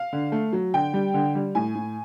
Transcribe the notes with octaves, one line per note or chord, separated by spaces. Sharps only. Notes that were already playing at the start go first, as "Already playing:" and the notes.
Already playing: F5
D3
A3
F#3
D3 G5
G3
D3
G3
A2 G#5
A2